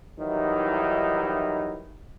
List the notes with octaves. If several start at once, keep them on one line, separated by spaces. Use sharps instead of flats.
D#3 E3 F#3 G3 D#4 E4